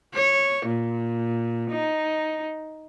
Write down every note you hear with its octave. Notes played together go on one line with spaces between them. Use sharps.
C#5
A#2
D#4